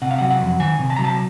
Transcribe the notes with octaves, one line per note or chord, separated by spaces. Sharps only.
C3 F#5
F5
F#3 F#5
F#5
F2
D#3 G#5
C3
A5
F#3 A#5
A5